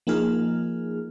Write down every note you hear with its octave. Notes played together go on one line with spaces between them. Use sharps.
F3 A#3 D#4 G#4 F6